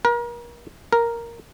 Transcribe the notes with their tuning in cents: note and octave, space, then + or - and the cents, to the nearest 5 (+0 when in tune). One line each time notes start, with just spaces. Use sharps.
A#4 +35
A#4 +0